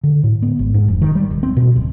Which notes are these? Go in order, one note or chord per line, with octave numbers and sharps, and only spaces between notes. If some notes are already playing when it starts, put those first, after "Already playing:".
D3
A2
B3
G#1
G#2
F1
D#3
G3
D#1
C4
B2
D1